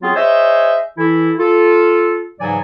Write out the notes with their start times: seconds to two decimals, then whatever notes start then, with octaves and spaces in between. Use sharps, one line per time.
0.01 F#3 B3 C4 F4 F#4 G#4
0.15 G#4 C5 C#5 D#5 E5
0.98 E3 E4 A4
1.38 F4 A4
2.40 G#2 C#3 E3 F#3 D5 G#5